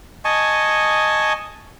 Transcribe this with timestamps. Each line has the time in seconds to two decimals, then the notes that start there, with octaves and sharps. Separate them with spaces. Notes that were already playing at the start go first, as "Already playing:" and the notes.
0.25 D#5 G#5 A5 C#6